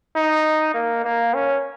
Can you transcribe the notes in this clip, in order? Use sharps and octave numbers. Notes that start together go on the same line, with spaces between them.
D#4
A#3
A#3
C#4